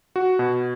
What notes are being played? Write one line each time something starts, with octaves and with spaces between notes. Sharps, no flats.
F#4
B2